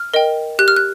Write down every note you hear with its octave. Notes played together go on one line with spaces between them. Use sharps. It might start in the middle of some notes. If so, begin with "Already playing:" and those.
Already playing: F6
A#4 D#5 G5
G4 F#6
F6
F#6